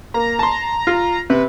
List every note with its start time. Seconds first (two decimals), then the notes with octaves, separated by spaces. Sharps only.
0.14 A#3 A#5
0.39 A5 C6
0.87 F4
1.30 C3 B4